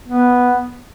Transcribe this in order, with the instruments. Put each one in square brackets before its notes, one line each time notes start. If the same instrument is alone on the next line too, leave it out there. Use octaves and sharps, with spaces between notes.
[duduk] B3